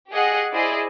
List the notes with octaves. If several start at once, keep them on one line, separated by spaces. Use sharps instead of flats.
G4 G#4 D#5 F#5
E4 G#4 C5 D5 D#5